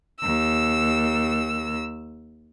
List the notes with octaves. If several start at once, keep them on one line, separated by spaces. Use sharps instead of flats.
D#2 E6